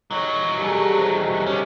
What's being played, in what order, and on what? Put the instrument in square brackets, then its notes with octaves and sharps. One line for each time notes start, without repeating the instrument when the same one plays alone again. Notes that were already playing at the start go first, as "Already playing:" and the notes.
[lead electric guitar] E2 F#3 [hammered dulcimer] D#3 C#5
[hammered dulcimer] G3 G#4 A4
C3
D#3
[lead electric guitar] C3 C#4